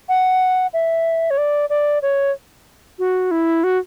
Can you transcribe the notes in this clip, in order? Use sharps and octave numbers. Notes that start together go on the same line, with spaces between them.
F#5
E5
C#5
D5
D5
C#5
F#4
E4
F#4